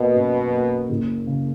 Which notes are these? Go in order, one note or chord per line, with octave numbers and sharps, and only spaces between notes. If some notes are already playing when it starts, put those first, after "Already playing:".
Already playing: B2 A#3
F#2
A#3
F#1
C#3